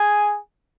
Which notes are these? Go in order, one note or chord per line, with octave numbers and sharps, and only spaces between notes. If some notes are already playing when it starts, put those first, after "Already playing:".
Already playing: G#4 G#5